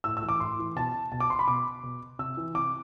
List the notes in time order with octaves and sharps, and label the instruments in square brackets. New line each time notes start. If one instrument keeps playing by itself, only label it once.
[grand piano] A2 E6
E6
E3
D6
A2 C6
E3
B2 A5
B2 A5
D6
C6
B5
B2 D6
B2
C3 E6
E3
C3 D6